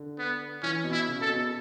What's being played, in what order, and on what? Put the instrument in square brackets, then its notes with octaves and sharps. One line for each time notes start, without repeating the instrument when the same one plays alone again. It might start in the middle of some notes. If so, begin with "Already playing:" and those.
Already playing: [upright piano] D3
[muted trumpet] B3
[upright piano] E3 [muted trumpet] C#4
[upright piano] B2
[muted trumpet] E4
[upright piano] C#3
[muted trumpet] A4
[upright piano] B2